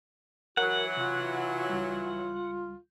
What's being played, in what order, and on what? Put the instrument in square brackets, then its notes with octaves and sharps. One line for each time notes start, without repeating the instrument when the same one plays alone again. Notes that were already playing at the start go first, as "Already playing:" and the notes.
[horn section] E3 F#3 [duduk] F#4 [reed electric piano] A#4 C#5 [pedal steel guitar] F#5
[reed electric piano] C3 [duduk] F4
[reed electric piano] C#2 G3